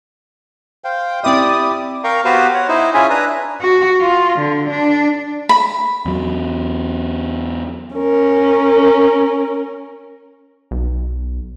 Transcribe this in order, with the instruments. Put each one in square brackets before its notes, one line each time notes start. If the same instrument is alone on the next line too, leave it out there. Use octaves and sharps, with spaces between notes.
[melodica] C5 F5 G5
[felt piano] C4 E5 [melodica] E4 G4 [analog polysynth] D5 D#6
[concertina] A#4 F5 G5 A#5 C#6
B3 F#4 G4 B4 C5 F5
C#5 F#5
D#4 E4 C5 D#5
C#4 E4 F4 G#4 E5 G#5
D4 B4 A#5 D#6
[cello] F#4
F4
D3
D4
[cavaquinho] B5
[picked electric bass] E2 F#3
[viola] C#4 A#4
[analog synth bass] B1